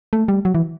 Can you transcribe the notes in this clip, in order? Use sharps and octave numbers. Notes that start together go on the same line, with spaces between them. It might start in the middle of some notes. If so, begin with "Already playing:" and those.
A3
G3
F#3
E3